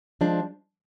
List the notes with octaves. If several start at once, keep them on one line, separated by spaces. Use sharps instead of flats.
F3 G#3 D4